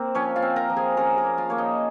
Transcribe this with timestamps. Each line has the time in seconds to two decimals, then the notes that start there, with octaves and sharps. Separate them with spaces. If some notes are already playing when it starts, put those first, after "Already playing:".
Already playing: A#3 C4 A#4
0.15 F3 C#4 C#5
0.36 F4 F5
0.42 C4
0.56 A#4 A#5
0.70 F3
0.77 G#4 G#5
0.97 C#4 A#4 A#5
1.17 A#4 A#5
1.24 A#3
1.38 F4 F5
1.50 A#3 C#5
1.58 D#4 D#5